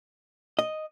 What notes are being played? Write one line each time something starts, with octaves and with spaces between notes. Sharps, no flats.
D#5